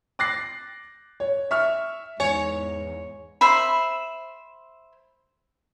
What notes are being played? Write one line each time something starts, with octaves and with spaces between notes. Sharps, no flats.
D6 F#6 A6 A#6 C7
C#5
E5 C#6 F6
E2 G#2 C#5 G#5
C5 E5 B5